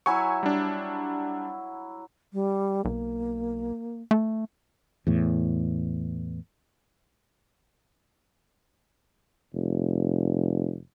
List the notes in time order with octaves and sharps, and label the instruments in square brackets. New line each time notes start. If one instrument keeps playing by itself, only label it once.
[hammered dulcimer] F#3 E4 [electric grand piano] G#5 C#6
[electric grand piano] G3 D4
[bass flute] G3
[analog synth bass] B1 [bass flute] A#3
[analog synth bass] A3
[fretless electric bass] E2 A2
[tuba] F1